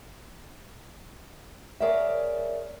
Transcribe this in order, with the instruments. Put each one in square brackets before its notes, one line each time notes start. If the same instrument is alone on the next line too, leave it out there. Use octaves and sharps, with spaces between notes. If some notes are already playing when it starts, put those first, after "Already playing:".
[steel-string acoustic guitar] G#4 A#4 C#5 D5 E5